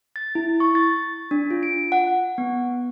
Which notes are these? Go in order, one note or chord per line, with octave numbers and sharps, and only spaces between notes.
A6
E4
C#6
A6
D4
F4
D7
F#5
B3